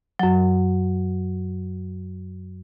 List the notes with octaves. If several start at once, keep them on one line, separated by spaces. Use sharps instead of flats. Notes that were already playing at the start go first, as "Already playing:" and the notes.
F#2 F#3